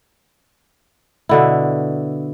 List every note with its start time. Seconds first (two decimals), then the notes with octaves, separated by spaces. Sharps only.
1.29 B2 D3 E4